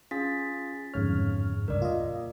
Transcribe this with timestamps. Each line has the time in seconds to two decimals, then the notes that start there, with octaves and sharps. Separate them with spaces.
0.11 C#4 F4 G#4 A6 B6
0.94 G1 F2 G#2 C#3 C#5 F6
1.68 C#2 G2 A#4 D5
1.82 A#2 F4 D#5